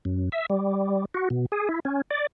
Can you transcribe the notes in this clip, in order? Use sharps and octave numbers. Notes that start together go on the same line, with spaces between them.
F#2
E5
G3
F#4
B2
G#4
E4
C#4
D5